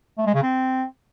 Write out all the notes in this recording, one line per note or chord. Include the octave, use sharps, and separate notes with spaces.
A3
G#3
C#3
C4